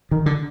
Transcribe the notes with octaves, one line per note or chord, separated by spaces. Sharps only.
D#3
D3